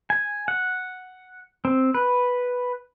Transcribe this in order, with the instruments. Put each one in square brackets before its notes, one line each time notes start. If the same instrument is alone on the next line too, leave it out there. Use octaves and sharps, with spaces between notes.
[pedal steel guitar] G#5
F#5
C4
B4